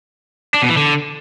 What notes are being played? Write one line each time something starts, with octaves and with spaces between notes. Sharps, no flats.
D4
B2
E3
D3